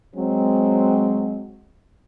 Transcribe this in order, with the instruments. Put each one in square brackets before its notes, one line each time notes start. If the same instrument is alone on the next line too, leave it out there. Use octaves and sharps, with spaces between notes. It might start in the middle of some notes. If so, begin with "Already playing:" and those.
[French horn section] F#3 G#3 C4